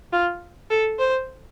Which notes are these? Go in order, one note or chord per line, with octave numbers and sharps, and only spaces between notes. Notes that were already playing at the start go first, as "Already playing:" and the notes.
F4
A4
C5